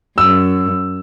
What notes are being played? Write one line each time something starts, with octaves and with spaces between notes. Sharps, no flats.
F#2 E6